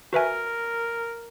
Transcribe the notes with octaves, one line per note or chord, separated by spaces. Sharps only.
F#4 A#4 B4 E5 G#5